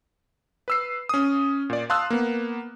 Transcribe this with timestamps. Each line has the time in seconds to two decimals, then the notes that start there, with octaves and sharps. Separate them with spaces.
0.68 B4 E6 C7
1.09 C#4 D#6
1.70 A#2 D5
1.90 F5 A5 C6 D#6 E6 F#6
2.10 A#3 B3